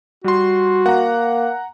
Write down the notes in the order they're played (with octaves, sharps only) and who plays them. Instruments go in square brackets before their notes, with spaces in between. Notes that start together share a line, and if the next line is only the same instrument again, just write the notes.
[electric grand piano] G3 C6 [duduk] F#4
[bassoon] A#3 [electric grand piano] F#5 A#5